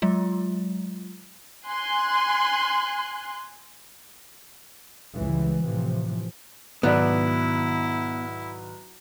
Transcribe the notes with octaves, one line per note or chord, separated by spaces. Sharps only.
F#3 G#3 F4
G#5 C6 F#6
C#2 E3 G3 G#3
A2 C3 E3 F3
B1 G#2 D#3 B3 E4 D5